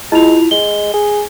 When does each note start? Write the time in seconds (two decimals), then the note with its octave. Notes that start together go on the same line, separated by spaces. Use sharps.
0.12 G#3 E4 F4 F7
0.51 G#3 G7
0.94 G#4